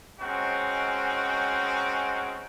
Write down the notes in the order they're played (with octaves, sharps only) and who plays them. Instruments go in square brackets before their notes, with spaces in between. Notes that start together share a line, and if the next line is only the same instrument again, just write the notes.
[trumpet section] G#3 C4 C#4 D#4 F#4